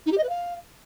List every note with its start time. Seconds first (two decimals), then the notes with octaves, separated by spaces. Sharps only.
0.06 D#4
0.11 G4
0.17 D#5
0.23 B4
0.29 F5